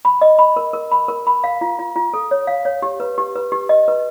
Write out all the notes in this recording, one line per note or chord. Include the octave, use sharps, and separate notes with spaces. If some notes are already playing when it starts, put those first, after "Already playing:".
B5
D#5
B5
A#4
A#4
B5
A#4
B5
F5
F4
F4
F4
A4
C#5
F5
C#5
G4
B4
G4
B4
G4
D#5
B4